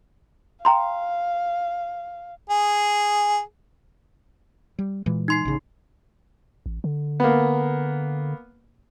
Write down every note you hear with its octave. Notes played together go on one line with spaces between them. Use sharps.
F5 G5 A#5 C6
G#4
G3
A#2 E3 G#3
D#4 C6 C7
A1 C#3
A1
D3
A#3 B3